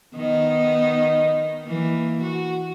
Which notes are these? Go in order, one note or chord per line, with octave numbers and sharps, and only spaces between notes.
D#3 B3 D#4
E3 A#3
F#4